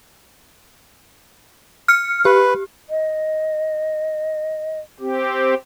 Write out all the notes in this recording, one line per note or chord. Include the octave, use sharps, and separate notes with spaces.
F6 C#7
G4 B4
D#5
C4 G4